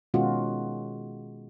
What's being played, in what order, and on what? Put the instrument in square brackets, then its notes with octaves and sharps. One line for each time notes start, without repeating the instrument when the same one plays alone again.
[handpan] B2 D#3 G#3 C#4 F4 F#4